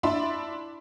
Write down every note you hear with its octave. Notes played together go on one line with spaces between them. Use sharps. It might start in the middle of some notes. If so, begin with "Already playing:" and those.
D4 E4 D5 E5 B5 C6